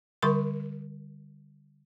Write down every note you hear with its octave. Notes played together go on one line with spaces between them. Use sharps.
D3 G3 A#4 C6 C#6